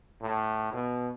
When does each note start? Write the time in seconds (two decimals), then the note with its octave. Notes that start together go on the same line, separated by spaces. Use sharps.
0.22 A2
0.73 B2